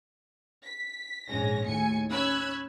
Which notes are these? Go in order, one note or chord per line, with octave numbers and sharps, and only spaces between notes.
B6
A#1 G#2 G#3 C#4 A#6
D#2 A2 G#5 C#7
C#4 B5 E6 F#6 G#6